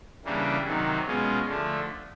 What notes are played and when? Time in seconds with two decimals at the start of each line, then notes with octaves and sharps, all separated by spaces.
0.24 C#3 E3 G3 A#3 D4
0.66 C3 D#3 F#3
1.06 B2 G#3 C#4 F4
1.47 D3 F3 A3